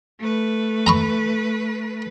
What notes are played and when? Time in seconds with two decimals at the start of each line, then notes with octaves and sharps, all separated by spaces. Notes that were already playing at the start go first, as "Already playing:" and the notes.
0.19 A3 B4
0.87 A#5 B5 C#6